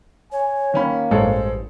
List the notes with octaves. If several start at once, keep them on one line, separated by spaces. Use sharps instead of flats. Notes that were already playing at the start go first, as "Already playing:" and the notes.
C#5 G#5
D#3 A#3 C#4 B5
A1 G2 G#3 A4 C5 C#5